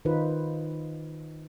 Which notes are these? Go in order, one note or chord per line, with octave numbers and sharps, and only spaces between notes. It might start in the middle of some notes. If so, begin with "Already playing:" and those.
D#3 D#4 F4 B4 C5